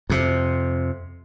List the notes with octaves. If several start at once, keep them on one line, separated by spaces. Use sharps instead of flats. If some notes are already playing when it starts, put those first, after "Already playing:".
F2 C3